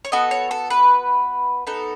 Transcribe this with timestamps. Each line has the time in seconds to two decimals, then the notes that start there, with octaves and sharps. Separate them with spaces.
0.05 C#5
0.12 B3 F#4 A4 D#5
0.31 C#5
0.51 A4
0.70 B4
1.67 B3 D#4 A4